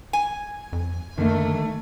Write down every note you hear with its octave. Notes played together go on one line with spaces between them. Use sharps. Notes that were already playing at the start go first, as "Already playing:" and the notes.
G#5
F2
F#2 D3 D#3 A3 A#3